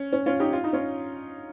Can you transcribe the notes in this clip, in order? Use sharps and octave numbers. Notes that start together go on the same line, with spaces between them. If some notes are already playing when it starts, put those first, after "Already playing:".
Already playing: C#4
C#4
C#4 F4
D#4 G4
F4
D#4
C#4 F4